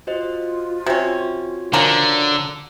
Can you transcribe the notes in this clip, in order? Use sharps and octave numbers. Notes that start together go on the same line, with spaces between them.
F4 F#4 C5 D#5
C3 C#4 F#4
D3 F3 C#4 A#4